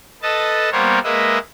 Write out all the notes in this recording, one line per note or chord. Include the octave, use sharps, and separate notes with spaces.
A4 B4 D#5 A5
G3 A#3 B3 A#4 C5 C#5
G#3 A#3 B4 D#5 E5